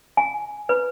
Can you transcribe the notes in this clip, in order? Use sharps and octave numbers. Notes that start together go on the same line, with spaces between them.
G#5
B4